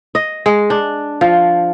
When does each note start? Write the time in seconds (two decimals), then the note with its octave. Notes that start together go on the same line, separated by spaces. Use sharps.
0.15 D#5
0.46 G#3
0.70 D4
1.21 F3